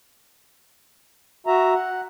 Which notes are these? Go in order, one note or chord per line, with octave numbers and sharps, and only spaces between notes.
F#4 E5 A#5
F#5